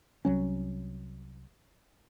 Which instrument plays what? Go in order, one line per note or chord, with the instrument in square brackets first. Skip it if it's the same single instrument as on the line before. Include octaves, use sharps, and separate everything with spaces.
[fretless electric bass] C2 F#3 C#4